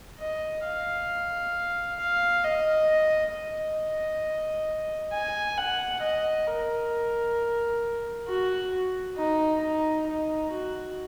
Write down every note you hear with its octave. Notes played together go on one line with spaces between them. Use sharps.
D#5
F5
F5
D#5
D#5
G#5
F#5
D#5
A#4
F#4
D#4
D#4
D#4
F#4